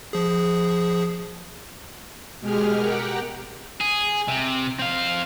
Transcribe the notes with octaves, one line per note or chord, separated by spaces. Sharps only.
F3 G#4
B2 G#3 G4 G#4 F6
G4 A#4 F#5 G5
G#4
C3
C4 F5